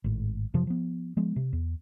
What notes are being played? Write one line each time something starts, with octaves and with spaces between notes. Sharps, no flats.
G#1 A2
F2 C3 F3 F#3
F3 B3
F3 G#3 B3
C3
E2